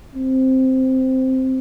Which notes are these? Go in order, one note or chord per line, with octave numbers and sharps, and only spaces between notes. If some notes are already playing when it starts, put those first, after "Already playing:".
C4